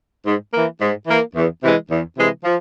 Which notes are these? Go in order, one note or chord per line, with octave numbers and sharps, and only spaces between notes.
G#2
E3 A#3
G#2
E3 A#3
E2
C3 E3 G#3
E2
C3 E3 G#3
F3